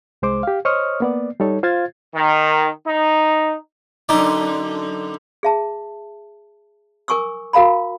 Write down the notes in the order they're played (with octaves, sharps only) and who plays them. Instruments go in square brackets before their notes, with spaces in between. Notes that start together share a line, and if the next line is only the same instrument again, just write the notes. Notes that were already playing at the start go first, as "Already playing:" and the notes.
[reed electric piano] C2 G#3 C5 D6
G4 F5
C5 C#5 D#5 C#6 D#6 F6
A#3 B3 D5
G3 D#4 A4 C#5
F4 C5 F5 G#6 A6
[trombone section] D#3
D#4
[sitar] F#2 D3 [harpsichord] D#4 D5
[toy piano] G#4 E5 A5
A#4 G#5 C#6 D6 E6
F#4 A#4 F5 A#5 B5